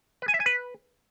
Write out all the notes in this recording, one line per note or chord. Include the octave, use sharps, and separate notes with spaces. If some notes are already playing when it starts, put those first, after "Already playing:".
B4
G#5
E5
G#5
B4